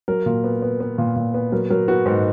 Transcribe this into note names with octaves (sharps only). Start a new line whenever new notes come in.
F#3 A#4
A#2
B3
B3
B3
A#2
A#2
B3
F#3 A#4
F#3 A#4
B3 F#4
G#2 D#4